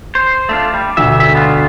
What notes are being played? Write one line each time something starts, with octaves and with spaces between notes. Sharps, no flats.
C5
A3 D4 F4
G3
D2 B2 E5
G#2 E5
B3 F4